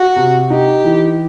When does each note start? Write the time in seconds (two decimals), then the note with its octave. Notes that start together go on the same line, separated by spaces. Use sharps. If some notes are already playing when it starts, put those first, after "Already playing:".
Already playing: F#4
0.16 C3
0.50 D#4 G4
0.84 E3